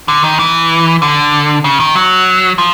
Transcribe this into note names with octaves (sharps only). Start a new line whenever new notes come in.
D3
D#3
E3
D3
C#3
D#3
F#3
F3